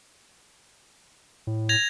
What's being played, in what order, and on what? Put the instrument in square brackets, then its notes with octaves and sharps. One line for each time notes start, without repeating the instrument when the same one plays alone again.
[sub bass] A2
[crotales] G#6 A#6 F7